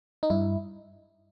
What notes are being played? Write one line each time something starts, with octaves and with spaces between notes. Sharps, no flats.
D#4
G2 E4